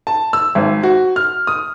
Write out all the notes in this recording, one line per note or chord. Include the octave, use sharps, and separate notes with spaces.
A5
E6
G#1
F#4
F6
D#6